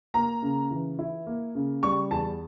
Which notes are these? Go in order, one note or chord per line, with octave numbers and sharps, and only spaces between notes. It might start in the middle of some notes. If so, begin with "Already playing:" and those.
A#3 A#5
C#3
E3
E4
A#3
C#3
G3 C#6
E2 A5